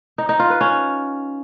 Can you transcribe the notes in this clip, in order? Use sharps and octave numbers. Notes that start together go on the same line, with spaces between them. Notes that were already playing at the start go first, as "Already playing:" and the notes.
D#4
D#4
F4
B4
C#4